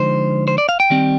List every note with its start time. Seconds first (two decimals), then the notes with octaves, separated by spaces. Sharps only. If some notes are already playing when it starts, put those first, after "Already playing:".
Already playing: D3 F3 G#3 D#4 C5
0.48 C5
0.58 D5
0.69 F5
0.80 G5
0.90 D#3 G3 C4